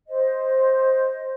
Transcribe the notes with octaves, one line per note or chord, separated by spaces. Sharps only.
C5 D#5